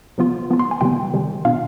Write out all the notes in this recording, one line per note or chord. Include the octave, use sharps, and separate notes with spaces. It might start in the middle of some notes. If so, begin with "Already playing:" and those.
C3 F3 B3 F4
F3 B3 F4
C6
G#5
C3 D#3 G3 B3 G5
C3 D#3 G3
B2 B3 D4 F4 F5